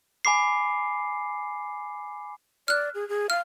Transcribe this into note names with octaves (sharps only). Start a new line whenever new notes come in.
G#5 B5 D6 C7
D5 F6 F#6
G#4
G#4
F5 F6